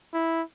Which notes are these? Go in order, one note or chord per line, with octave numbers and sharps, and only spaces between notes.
E4